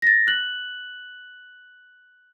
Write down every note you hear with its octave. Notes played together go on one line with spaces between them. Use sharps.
A6 A#6
F#6 F#7